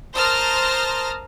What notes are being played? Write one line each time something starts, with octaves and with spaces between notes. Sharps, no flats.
A#4 C5 A5 D#6 F6 A#6